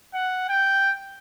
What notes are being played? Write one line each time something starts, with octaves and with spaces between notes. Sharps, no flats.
F#5
G5